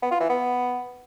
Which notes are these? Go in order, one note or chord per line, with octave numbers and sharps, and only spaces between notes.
B3
F4
E3
B3